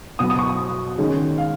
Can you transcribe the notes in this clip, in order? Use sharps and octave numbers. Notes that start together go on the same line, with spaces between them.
B2 F#3 B3 D#6
D#6
C#6
D#6
D#3 G#3 C#4
F5